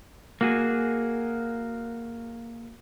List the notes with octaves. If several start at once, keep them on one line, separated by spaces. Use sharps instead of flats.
A#3 F#4 G#4